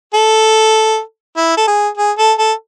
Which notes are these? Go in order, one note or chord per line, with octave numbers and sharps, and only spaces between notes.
A4
E4
A4
G#4
G#4
A4
A4